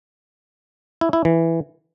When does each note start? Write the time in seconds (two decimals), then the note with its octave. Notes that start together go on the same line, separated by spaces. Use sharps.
1.01 E4
1.13 E4
1.25 E3